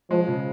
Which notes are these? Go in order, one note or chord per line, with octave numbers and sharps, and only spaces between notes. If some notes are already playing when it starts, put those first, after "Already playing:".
F3 G#3
C#3